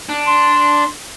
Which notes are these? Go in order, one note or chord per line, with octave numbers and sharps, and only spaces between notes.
D4
C6